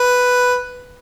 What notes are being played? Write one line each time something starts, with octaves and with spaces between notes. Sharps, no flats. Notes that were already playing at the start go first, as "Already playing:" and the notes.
Already playing: B4